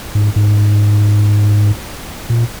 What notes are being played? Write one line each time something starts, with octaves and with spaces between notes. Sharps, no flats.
G#2
G#2
A#2